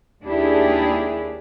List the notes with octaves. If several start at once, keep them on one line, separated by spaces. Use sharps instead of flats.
D#2 D4 E4 G4 G#4